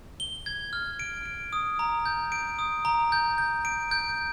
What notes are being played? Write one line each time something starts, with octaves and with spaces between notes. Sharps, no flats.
G7
G#6
F6
D7
D7
D#6
A#5
G6
D7
D#6
A#5
G6
G6
D7
G6